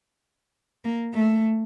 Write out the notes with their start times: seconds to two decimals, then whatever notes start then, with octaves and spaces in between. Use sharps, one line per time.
0.85 A#3
1.14 A3